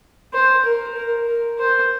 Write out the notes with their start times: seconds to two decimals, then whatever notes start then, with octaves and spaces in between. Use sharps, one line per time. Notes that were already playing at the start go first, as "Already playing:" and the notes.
0.34 C5
0.65 A#4
0.97 A#4
1.28 A#4
1.59 C5